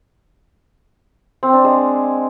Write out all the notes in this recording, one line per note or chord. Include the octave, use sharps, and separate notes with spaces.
C4
D4
G#3